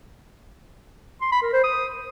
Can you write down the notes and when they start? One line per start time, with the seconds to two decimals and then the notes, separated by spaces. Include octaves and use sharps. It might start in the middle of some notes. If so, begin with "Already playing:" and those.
1.21 C6
1.32 B5
1.42 A#4
1.53 C5
1.64 D#6